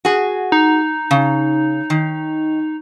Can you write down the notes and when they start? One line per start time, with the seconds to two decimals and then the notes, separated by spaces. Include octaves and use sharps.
0.05 F#4 G#4
0.52 D#4
1.11 C#3
1.90 D#3